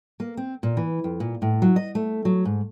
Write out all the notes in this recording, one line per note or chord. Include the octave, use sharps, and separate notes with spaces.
A#3
C4
A#2
E3
F2
A#2
A2
F#3
D#5
A3
F#3
G#2